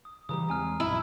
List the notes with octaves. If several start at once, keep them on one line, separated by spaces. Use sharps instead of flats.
D#6
C#3 E3 G3 A#5 D#6
E2 G#3 C4 G#5 F6
A#1 F#2 E4